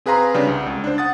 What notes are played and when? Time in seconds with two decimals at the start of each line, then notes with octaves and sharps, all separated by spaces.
0.06 C4 G#4 B4 F5 A#5 C6
0.34 C#3 G3 D4 G4
0.47 C2
0.66 C#2
0.84 D4 C5
0.98 F#5 D#6 A6